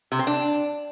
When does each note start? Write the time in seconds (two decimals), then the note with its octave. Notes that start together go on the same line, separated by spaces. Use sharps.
0.12 C3
0.19 C4
0.27 D4